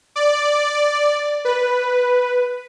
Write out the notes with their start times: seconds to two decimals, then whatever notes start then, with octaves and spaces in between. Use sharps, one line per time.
0.16 D5
1.45 B4